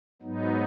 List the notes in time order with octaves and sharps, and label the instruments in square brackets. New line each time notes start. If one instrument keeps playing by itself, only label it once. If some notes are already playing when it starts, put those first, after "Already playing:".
[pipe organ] G#2 F#3 B3 D#4